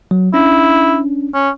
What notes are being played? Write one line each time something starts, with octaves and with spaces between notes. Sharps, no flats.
F#3
C#4 D4 E4
C#4